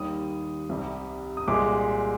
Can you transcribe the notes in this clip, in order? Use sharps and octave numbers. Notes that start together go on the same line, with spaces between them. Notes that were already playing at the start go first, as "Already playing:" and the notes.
Already playing: D#2 D#3 G3 D#6
C2 C3 G3
D#6
C2 A#2 G#3 D6